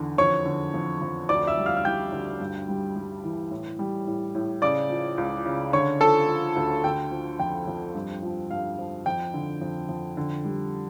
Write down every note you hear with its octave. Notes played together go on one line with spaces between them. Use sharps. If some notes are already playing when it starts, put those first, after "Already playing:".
Already playing: E2 D3
F2 C#5 C#6
D3
F2
F2
D2 D5 D6
E5 E6
G3
F5 F6
F6
G3 G5 G6
D2
G2
G3
G3
E3
A2
G3
A2
A2
C#3 D5 D6
F3
C#2
C#3
D3 C#5 C#6
F3 A4 A5
F3
D2
D3 G5
F3
F2 G5
F2
G2
F3
G2 F5
F3
F2 G5
D3
F2
F2
D3
G3